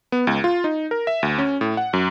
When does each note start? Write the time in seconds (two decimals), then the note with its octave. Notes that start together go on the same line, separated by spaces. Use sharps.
0.12 B3
0.27 C#2
0.44 F4
0.64 D#4
0.91 A#4
1.07 E5
1.23 D2
1.38 C#4
1.61 A2
1.77 F#5
1.93 F#2